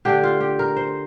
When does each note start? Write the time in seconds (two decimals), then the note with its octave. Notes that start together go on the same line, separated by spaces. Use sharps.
0.05 D3 A3 D4 G4
0.23 F4
0.40 G4
0.59 A#4
0.76 C5